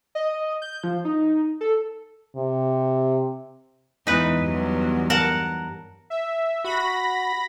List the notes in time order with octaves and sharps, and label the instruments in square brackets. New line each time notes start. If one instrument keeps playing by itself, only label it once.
[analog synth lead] D#5
G6
F3
D#4
A4
[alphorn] C3
[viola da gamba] E2 E3 G#3 [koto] D#4 B4
[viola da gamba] E2 G2 F#3
[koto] A#4 F#5 A5
[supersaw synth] E5
[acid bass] F#4 [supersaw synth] B5 A#6